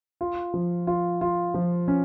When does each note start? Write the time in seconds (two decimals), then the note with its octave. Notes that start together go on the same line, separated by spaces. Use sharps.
0.21 F4
0.54 F3
0.87 F4
1.21 F4
1.54 F3
1.88 C#4